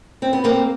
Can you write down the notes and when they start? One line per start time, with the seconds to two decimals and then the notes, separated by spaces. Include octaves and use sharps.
0.22 C4
0.33 B3
0.44 A#3 C4